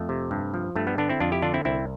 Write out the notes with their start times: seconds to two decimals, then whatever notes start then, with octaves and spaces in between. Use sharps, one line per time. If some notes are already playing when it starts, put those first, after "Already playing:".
Already playing: F2 A3
0.09 C3
0.31 G2
0.54 F3
0.76 G2 A3
0.87 G3 B3
0.98 D3 B3 D4
1.09 C4 E4
1.20 F2 D4 F4
1.32 E4 G4
1.42 D3 D4 F4
1.54 C4 E4
1.65 C2 C4 E4